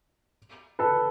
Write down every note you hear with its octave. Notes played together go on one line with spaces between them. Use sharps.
A4 B4